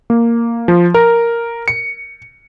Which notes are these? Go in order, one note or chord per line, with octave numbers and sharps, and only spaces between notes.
A#3
F3
A#4
C#7